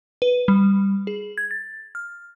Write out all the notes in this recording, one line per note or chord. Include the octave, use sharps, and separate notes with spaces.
B4
G3
G#4
G#6
A6
F6